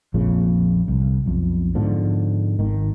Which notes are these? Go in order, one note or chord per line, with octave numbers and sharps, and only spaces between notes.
A#1 F2 A#2 C#3
C2
B1 F2
G#2 B2 D3 F3
G#1 D#3